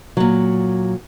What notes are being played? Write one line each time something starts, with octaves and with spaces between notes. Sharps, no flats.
A#2 F#3